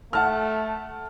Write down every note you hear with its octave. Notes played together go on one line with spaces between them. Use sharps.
A3 F#5 A5 F6